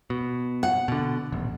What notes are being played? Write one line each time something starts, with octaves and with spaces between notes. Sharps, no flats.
B2
F#5
B2 D3
D#1 A1